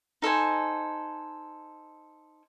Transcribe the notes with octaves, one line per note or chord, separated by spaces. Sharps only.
D#4 A4 C5 G#5